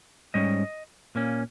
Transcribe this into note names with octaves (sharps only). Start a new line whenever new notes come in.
G#2 G3 C#4 D#5
A#2 A#3 C#4